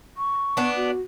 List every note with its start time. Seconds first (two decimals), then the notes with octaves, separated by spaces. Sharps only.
0.17 C#6
0.57 B3 D4
0.76 F#4